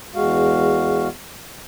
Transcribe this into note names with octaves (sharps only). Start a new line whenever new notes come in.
E2 G#3 F#4 F5